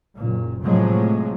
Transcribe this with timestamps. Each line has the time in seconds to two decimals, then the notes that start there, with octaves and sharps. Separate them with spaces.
0.15 F#1 A#2
0.63 A2 C3 F3 F#3 G#3